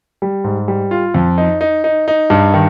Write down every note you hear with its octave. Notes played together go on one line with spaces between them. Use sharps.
G3
G#2
G3
F4
F2
D#4
D#4
D#4
D#4
G2
D#3